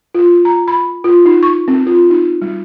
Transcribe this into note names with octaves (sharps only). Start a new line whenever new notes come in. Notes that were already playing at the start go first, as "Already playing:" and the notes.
F4
A#5
B5
F4
D#4
C#6
C4
F4
D#4
G3